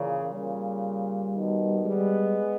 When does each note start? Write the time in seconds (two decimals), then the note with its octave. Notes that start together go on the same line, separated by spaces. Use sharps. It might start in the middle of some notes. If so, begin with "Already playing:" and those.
Already playing: A#2 C#3 E3
0.31 A#2 C#3 G3
1.34 B2 D#3
1.84 G3 G#3 B3